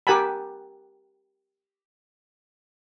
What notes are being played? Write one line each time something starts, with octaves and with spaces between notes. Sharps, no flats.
G4 A#4 F#5 G#5 A5 B5